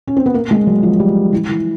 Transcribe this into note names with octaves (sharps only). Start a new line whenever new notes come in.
C#4
C4
B3
A#3
G#3
F#3
F3
G3
E3
E3